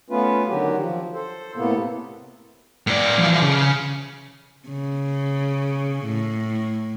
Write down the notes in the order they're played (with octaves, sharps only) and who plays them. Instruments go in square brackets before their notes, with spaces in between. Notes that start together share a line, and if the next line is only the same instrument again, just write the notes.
[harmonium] A3 B3 C#4 F4 B4
D3 D#3 F#3 F#4 G4
F3
A4 C5
A2 C3 A#3 B3 A4
[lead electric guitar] A2 D5
E3 F3
C#3
[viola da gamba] C#3
A2